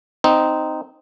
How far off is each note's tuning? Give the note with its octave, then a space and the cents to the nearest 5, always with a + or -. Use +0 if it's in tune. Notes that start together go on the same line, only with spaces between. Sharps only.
C4 -10 D#4 +0